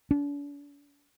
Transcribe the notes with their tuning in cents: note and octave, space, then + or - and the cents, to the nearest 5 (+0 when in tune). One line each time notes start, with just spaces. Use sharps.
D4 -45